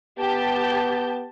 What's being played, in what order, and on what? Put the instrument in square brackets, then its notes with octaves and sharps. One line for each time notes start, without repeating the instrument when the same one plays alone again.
[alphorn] B3 [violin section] G4 A5 G6